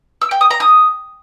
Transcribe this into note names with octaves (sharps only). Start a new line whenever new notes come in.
E6
G5
D#6
A#5
D#6